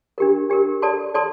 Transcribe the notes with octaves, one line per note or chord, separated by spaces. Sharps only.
D4 G4 A#4
D4 G4 A#4
A4 D5 A5 C6
A4 D5 A5 C6